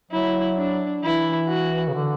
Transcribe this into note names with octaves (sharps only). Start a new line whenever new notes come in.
F#3 E4
D4
E3 E4
F#4
C#3
D3